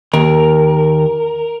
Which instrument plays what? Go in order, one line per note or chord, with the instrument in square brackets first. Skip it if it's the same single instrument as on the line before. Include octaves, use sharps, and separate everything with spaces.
[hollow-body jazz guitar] D#2 [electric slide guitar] A#4